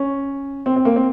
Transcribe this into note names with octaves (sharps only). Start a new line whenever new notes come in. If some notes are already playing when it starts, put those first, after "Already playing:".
Already playing: C#4
C4
C4
A#3
C4